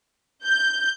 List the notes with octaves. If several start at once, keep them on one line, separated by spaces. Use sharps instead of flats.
G6